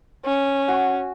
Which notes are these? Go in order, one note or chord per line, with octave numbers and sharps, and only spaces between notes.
C#4
F#4 G#5